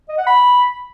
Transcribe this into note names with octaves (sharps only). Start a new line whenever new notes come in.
D#5
F#5
B5